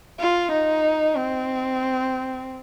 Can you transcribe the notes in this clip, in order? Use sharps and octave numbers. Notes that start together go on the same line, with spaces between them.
F4
D#4
C4